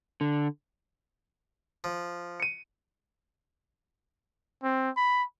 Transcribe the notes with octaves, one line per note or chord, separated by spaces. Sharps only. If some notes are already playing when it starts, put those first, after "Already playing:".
D3
F3
C#7 D#7
C4
B5